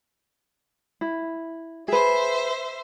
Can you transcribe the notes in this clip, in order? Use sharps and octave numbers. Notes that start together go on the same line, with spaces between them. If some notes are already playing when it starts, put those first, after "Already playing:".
E4
G#4 B4 C5 E5